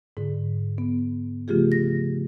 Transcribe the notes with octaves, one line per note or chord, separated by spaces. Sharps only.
G#2 D3
B3
C#3 F3 A3 F4 G4 G#4
A#6